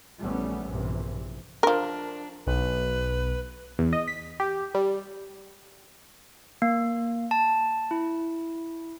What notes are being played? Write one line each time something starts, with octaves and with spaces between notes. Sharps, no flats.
A#1 E3 G3 A3 B3 C#4
A#1 G2 C3 E3
F3 D4 A#4
B1 B4
E2
D#5
B6
G4
G3
A#3
A5
E4